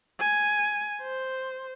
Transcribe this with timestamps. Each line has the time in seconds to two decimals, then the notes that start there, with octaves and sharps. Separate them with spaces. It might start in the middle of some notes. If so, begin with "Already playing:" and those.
0.20 G#5
1.02 C5